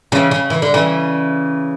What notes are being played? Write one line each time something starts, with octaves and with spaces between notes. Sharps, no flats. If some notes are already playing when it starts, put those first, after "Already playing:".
C#3 E3
C#3
E3
D3
C#3 E3